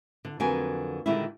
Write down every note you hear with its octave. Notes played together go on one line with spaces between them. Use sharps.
D3
F2 D3 F#3 A#3 B4 G#5
A#2 D3 D#3 G3 G#3 E4